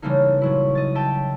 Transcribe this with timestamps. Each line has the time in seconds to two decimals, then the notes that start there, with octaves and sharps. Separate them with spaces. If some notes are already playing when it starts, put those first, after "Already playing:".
0.02 C#3 E3 G3 A3 A#3 D#4
0.42 A#2 F#3 E4
0.75 D#5 A6
0.95 E5 G5 A5